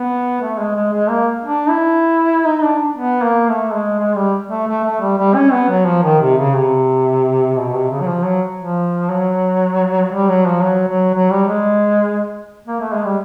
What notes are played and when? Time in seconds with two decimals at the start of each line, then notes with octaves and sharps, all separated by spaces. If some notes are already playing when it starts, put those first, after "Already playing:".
Already playing: B3
0.41 A3
0.58 G#3
0.76 G#3
0.93 G#3
1.10 A#3
1.43 D4
1.69 E4
2.46 D#4
2.63 D4
2.96 B3
3.22 A#3
3.48 A3
3.73 G#3
3.99 G#3
4.16 G3
4.50 A3
4.67 A3
4.84 A3
5.01 G3
5.18 G3
5.35 C#4
5.52 B3
5.69 F#3
5.86 F3
6.03 D#3
6.20 C3
6.37 C#3
6.55 C3
7.56 B2
7.73 C3
7.90 C#3
8.01 F#3
8.07 F3
8.24 F#3
8.58 F3
9.10 F#3
10.12 G3
10.29 F#3
10.46 F3
10.62 F#3
10.89 F#3
11.14 F#3
11.31 G3
11.48 G#3
12.67 A#3
12.80 A3
12.93 G#3
13.05 G3